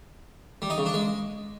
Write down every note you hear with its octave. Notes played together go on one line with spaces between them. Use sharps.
G3
D#4
C#3
D4
G#3